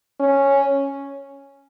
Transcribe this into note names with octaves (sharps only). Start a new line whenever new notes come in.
C#4